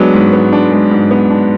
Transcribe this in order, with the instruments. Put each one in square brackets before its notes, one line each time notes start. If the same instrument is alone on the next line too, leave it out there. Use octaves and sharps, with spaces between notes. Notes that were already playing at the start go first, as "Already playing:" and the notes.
Already playing: [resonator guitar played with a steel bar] F#3 [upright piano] G#3 B3 D4
[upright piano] G#2
B3
D4
G#3
G#2
B3
D4